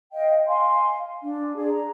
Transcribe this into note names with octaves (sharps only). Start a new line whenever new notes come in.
D#5 F5 G5
F5 G#5 C6
D4
G#4 D5
A#5